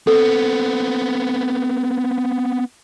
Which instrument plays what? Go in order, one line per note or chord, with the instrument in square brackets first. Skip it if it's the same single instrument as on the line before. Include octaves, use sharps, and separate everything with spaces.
[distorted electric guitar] B3 C4 [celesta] A4